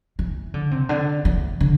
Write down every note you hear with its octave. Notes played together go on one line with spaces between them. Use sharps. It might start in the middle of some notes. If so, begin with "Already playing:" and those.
E3
D3
C3
D3
E3
D3